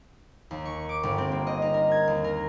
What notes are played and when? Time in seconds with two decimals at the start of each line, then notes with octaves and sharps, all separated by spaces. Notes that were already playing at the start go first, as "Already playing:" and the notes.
0.51 D#2
0.65 C#6
0.89 D6
1.03 G1
1.18 C4
1.31 A#3
1.47 D#5
1.62 D#4
1.74 A#4
1.91 G#6
2.08 D#2
2.24 A#4